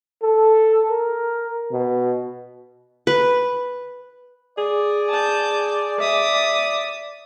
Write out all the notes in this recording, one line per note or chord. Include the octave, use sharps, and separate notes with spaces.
A4
A#4
B2
B4
G#4 D5
A5 G6
E5 D6 D#6